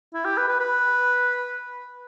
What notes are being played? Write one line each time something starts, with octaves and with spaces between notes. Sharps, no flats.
E4
G4
B4
B4
B4